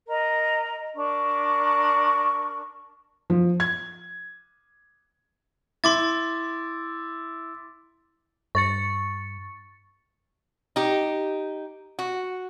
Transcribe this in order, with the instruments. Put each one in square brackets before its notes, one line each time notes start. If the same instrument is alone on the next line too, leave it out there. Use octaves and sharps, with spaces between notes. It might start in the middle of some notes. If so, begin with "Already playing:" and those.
[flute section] A#4 D#5 A#5
D4 A#4 C#6
[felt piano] F3
G#6
[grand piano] E4 [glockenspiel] C6 D6 A6
[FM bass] G2 [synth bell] C#6 A6 C#7
[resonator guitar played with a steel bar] D#4 G4
F#4